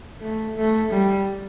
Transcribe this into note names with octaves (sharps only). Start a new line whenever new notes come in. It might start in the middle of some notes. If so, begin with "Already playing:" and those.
A3
A3
G3